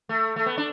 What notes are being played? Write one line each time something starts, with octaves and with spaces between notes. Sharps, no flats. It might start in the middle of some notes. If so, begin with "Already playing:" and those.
A3
A3
B3
D4